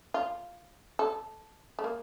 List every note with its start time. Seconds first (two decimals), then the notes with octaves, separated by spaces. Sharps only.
0.14 F4
0.99 A4
1.79 A3
1.84 A#3